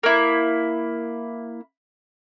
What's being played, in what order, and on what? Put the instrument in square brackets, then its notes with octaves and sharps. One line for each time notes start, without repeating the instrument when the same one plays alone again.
[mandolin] A#3 E4